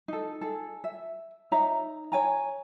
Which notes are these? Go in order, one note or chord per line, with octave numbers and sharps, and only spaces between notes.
D#4 A4
G#4 A4
E5
D#4 C#5 E5 A#5
C#5 G#5 A#5